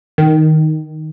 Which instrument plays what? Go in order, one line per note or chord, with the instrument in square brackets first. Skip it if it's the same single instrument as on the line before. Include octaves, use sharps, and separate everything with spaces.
[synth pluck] D#3